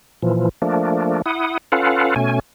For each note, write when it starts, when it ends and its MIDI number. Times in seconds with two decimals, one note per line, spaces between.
0.22 0.49 46
0.22 0.49 52
0.22 0.49 53
0.62 1.22 53
0.62 1.22 57
0.62 1.22 58
0.62 1.22 62
1.26 1.58 64
1.26 1.58 78
1.26 1.58 87
1.72 2.14 61
1.72 2.14 65
1.72 2.14 69
1.72 2.14 71
1.72 2.14 77
1.72 2.14 78
2.16 2.39 47
2.16 2.39 57
2.16 2.39 61
2.16 2.39 80